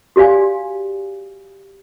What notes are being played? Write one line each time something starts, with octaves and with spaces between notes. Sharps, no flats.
F#4 G4 D5 F5 G#5